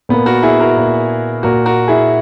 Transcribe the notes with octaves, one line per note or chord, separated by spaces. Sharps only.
A#2 A#3 B3
F#4 A#4
E4 G#4
F#4 A#4
A#2 A#3
A#2 A#3 F#4 A#4
F#4 A#4
E4 G#4